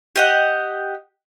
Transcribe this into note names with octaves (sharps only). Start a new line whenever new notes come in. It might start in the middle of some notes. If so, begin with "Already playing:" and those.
G4 D#5 F#5